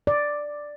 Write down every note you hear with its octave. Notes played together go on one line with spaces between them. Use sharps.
D5